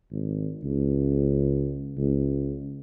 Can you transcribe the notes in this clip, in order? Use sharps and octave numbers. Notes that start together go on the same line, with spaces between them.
G#1
C#2
C#2